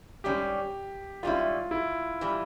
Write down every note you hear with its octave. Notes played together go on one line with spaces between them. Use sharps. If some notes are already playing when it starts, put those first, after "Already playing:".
G#2 G3 C#4 G4
G#2 G3 C#4 E4 F4
E4
E3 G3